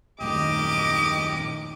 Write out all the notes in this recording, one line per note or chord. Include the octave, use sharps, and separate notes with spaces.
D#1 A#1 F#2 D#3 A3 G4 D#5 D6